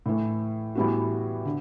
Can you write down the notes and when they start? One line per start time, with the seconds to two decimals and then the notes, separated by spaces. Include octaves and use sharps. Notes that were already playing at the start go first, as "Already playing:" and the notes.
0.06 A2 E3 A3
0.75 A2 E3 G3 B3 F#4
1.45 D3